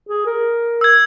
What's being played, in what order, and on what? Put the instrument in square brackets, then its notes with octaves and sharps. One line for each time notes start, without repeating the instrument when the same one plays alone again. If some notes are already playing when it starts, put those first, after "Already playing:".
[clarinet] G#4
A#4
[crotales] E6 G#6